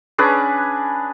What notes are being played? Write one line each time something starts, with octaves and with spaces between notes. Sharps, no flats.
C#4 D4 G#4 B4